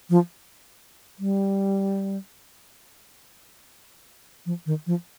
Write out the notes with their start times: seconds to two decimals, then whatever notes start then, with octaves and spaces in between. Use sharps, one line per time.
0.10 F3
1.19 G3
4.46 F3
4.66 D#3
4.86 F3